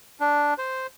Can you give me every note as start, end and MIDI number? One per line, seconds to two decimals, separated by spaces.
0.21 0.54 62
0.58 0.87 72